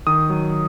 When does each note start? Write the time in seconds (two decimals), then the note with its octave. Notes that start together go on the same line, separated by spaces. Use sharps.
0.07 D#3 D#6
0.30 F#3